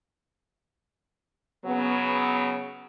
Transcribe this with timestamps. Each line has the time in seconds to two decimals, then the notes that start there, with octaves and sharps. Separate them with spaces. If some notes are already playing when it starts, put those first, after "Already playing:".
1.65 C#3 F#3 B3